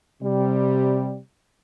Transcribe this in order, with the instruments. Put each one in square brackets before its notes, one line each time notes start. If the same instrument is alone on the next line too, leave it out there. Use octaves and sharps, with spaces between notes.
[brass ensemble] C3 G3